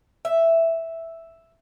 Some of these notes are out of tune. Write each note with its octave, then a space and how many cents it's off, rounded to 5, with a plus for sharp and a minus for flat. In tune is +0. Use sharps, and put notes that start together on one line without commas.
E5 +0